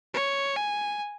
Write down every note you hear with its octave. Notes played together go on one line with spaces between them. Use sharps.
C#5
G#5